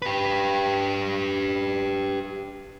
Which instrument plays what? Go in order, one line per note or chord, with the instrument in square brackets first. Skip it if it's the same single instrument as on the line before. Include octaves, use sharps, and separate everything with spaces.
[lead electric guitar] G4 B4